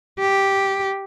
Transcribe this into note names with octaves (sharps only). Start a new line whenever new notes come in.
G4